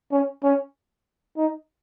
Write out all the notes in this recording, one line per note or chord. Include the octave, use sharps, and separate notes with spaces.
C#4
C#4
D#4